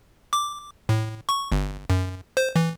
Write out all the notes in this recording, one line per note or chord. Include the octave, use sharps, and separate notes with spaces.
D6
A2
C#6
G1
F#2
C5
E3